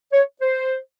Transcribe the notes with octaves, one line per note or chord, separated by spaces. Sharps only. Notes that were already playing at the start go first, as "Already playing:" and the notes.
C#5
C5